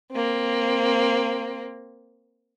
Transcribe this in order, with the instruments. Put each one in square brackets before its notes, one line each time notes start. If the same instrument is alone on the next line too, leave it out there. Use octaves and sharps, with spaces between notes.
[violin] A#3 C4